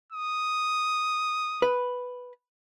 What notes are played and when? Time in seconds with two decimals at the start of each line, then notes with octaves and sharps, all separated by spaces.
0.12 D#6
1.62 B4